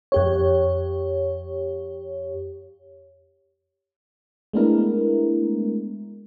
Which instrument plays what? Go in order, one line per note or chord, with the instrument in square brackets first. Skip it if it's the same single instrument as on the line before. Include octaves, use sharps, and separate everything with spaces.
[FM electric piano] F2 G4 C#5
G#3 A3 B3 D4 E4 A#4